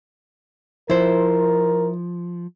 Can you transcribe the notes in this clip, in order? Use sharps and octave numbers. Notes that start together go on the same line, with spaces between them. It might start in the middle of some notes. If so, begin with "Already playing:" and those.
F3 E4 A#4 C5